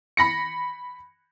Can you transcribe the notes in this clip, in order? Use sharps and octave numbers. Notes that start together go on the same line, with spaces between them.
B5 A#6 C#7